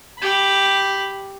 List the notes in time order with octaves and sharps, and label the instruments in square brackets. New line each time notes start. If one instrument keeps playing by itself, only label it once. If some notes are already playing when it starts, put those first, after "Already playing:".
[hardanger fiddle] G4 B5